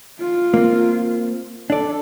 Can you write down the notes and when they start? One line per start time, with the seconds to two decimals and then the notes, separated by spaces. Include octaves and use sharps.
0.20 F4
0.54 A#3 C4
1.70 D4 A4 D5